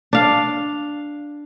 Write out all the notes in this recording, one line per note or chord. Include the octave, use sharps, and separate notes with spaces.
D4 F5